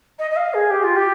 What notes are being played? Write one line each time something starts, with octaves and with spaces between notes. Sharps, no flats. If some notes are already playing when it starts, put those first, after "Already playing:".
D#5
D#5
F5
G#4
G4
F4
G4